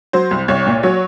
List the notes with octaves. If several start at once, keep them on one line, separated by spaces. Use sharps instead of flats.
F#3 C5
C2
C2 C#5
A#2
F#3 C#5